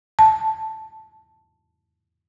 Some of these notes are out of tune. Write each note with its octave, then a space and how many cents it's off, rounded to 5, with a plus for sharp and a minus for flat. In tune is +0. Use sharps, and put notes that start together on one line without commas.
A5 +0